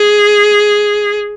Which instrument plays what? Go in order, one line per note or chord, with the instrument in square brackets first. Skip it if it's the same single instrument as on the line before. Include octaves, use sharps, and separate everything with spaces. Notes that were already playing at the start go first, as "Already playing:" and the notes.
Already playing: [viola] G#4